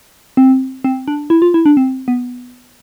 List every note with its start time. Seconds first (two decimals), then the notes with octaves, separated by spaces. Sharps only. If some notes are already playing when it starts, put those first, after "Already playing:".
0.37 C4
0.84 C4
1.08 D4
1.30 E4
1.42 F4
1.54 E4
1.66 D4
1.77 C4
2.08 B3